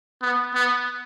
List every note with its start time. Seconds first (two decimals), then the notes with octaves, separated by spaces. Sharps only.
0.22 B3
0.55 B3